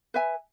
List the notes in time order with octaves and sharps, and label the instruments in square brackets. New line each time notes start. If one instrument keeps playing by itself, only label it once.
[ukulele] B4 E5 G#5